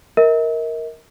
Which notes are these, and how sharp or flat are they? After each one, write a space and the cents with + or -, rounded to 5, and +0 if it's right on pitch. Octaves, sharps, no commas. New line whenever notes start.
A#4 +0 D#5 +45